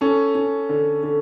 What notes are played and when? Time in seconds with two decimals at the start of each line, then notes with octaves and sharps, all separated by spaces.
0.01 C#4 A4
0.35 C#4
0.69 D3
1.03 D3